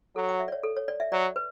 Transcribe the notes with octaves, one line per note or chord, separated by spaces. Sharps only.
F#3 A4
F#5
E5
D5
C#5
A4
C#5
D5
E5
F#3 D5
B4